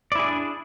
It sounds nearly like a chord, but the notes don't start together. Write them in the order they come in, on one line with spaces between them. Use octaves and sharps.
D5 E4 G#4 D4